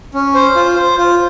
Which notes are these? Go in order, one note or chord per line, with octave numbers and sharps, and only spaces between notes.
C#4
C5
F4
C5
F4